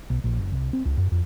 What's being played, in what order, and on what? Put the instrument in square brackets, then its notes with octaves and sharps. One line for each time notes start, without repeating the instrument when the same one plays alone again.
[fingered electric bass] B1
A#1
F#1
C2
C4
C#2
F#2
F2